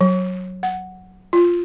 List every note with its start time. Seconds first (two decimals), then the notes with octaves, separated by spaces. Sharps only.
0.01 F#3
0.63 F#5
1.33 F4